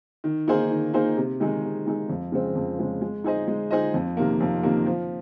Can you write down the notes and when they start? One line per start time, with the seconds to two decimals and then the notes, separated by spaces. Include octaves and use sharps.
0.24 D#3
0.48 A#3 D#4 G#4 C5
0.71 D#3
0.94 A#3 D#4 G#4 C5
1.17 C3
1.40 D#3 G#3 D#4 G#4
1.63 C3
1.86 D#3 G#3 D#4 G#4
2.09 F2
2.32 C#3 G#3 C4
2.55 F2
2.79 C#3 G#3 C4
3.02 G#3
3.24 D#4 G#4 C5 D#5
3.48 G#3
3.71 D#4 G#4 C5 D#5
3.94 F2
4.17 C3 D#3 A#3
4.40 F2
4.63 C3 D#3 A#3
4.86 F3